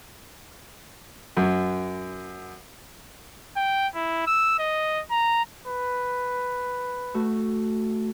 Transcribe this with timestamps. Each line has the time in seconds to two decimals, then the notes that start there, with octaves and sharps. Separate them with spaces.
1.37 F#2
3.57 G5
3.95 E4
4.27 E6
4.59 D#5
5.11 A#5
5.67 B4
7.14 A3 F#4